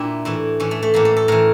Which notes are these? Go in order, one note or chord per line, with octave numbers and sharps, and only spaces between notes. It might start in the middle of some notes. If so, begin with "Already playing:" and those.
Already playing: A#2 D4 E4 G4
A2 E3 E4
A2 E3 C#4
A3
A3
A2 E3 A#3
A4
A4
A2 E3 A#4